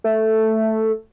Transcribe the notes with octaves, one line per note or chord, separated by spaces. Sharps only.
A3